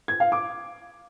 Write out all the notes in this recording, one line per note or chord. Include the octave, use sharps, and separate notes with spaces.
G#6
F5
D6